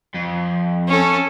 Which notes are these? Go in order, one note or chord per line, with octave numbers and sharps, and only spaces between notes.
F2
C#4 A4